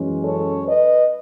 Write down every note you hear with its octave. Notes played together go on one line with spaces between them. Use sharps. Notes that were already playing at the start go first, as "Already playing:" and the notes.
Already playing: F#2 E3 G#3 C#4
A4 C#5
B4 D#5